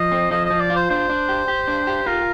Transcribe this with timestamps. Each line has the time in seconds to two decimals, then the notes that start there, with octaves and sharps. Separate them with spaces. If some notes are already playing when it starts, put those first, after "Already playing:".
Already playing: F3 D#5
0.12 C4
0.31 F3 D#5
0.45 F3 D#5
0.60 D5
0.70 F4
0.76 C5
0.90 D4 C5
1.10 D4
1.29 G4
1.48 G4
1.68 D4
1.87 G4
2.06 F4 A#4